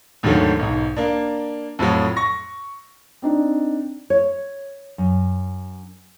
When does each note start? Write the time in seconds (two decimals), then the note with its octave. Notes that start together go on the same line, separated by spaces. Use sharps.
0.23 D#2 G#2 D3 F#3 A3
0.59 B1 G#2
0.97 A#3 D4
1.79 F2 A2 F3 F#3
2.17 C#6 A#6
3.22 C4 D4 D#4
4.10 C#5
4.98 F#2